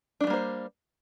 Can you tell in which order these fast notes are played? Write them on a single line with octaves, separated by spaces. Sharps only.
D4 A3 G3 A#3 C5